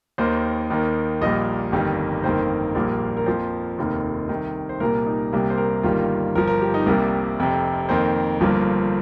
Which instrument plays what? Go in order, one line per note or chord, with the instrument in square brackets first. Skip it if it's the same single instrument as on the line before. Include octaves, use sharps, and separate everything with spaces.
[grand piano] D#2 D#3 A#3 C5
D#2 D#3 A#3
A#1 A#2 G3 A#3 D#5
G1 F2 D#3 G3 A#3
G1 F2 D#3 A#3 C5
A#1 A#2 G3 A#3
A#4
F2 F3 A#3 C5
F1 D#2 D#3 A#3
C2 C3 D#3
C5
C2 A#2 G3 A#3 A#4
D#4
C2 C3 G3 A#3
C5
A#4
G1 G2 D#3 G3 A#3 F4
G1 G2 F3 A#4
A#4
G4
D#4
C2 C3 G3 A#3 A#4
F1 F2 C3
F2 D#3 A#3 C5
G1 G2 F3 A#3